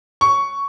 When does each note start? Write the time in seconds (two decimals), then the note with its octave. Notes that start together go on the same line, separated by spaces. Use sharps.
0.21 C#6